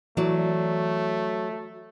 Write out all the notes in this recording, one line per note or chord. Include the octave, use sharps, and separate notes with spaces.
E3 F#3 A3 D5